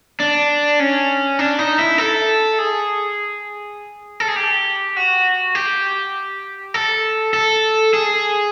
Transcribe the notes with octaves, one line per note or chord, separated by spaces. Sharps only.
D4
C#4
D4
D#4
E4
A4
G#4
A4
G#4
G4
F#4
G4
A4
A4
G#4